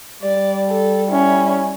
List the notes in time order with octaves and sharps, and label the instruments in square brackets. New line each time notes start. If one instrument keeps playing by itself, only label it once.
[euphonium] G3 [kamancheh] D5
[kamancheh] A4
C#4 E4